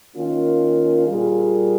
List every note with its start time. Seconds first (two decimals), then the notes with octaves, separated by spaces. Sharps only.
0.16 D#3 A#3 C#4 F4
1.07 A#2 G3 A#3 F4 G#4